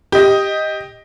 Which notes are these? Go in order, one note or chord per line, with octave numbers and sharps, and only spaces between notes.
G4 D#5